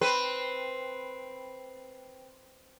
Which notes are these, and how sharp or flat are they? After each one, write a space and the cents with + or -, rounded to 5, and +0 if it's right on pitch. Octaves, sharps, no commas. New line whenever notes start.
C4 +0 B4 +0